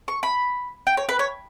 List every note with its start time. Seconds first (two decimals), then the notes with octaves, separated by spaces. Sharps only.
0.08 C#6
0.23 B5
0.87 G5
0.97 C#5
1.09 B4
1.19 C#5